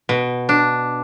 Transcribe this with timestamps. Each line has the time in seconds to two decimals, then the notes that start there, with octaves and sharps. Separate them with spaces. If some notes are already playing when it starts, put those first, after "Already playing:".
0.09 B2
0.49 D4